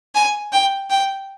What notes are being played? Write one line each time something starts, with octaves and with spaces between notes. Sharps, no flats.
G#5
G5
G5